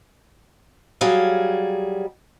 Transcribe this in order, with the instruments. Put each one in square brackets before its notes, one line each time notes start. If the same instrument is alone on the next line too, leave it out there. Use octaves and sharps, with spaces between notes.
[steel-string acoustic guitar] F#3 G3 G#4 F5